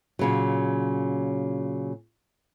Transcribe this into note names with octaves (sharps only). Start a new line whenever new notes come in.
A#2 C#3 F#3